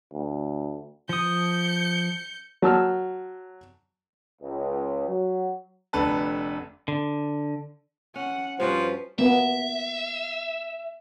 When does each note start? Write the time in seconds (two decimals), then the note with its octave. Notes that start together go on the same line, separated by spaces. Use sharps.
0.13 D2
1.09 F3 D#6 G6 C#7
2.62 F#3 A5 E6 F6
4.41 C#2
5.08 F#3
5.93 F1 D3 B4 A5
6.88 D3
8.16 C#4 F#5
8.60 G2 F3 C#4 F#4 B4 C5
9.19 A#3 B3 E5